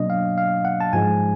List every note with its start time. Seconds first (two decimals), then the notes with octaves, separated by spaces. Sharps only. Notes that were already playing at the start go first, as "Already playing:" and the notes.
Already playing: B2 F#3 A#3 D4 D#5
0.10 F5
0.38 F5
0.65 F#5
0.81 A5
0.93 G#2 F3 G#3 G#5